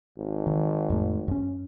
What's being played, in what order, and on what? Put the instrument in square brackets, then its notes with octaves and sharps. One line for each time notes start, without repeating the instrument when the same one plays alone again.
[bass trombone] G#1
[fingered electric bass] D#3
F2 A2 A3
F#2 C#4